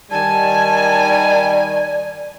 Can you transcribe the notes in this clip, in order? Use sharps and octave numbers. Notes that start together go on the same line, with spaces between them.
D#3 G3 D5 G#5 A5